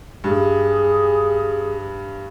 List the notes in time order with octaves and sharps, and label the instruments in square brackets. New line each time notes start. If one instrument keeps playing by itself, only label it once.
[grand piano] G2 [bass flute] G#4